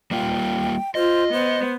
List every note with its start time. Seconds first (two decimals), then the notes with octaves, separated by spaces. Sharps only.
0.11 G3 A#3 F4 G5
0.95 F4 C5 D#5
1.33 B3 C5